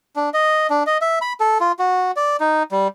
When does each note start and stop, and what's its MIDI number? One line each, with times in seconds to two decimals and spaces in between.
0.16 0.30 62
0.34 0.67 75
0.70 0.83 62
0.87 0.98 75
1.01 1.19 76
1.22 1.33 83
1.40 1.58 69
1.60 1.72 65
1.79 2.11 66
2.16 2.37 74
2.40 2.63 63
2.72 2.88 55